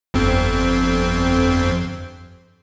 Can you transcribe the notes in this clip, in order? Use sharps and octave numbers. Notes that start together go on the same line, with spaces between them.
G1 F2 C4